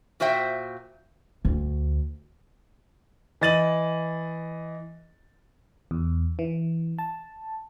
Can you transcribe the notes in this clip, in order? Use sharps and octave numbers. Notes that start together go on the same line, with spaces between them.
A#2 F#4 C5 E5 G5
D2
E3 D#5 A6 D#7 F#7
E2
E3
A5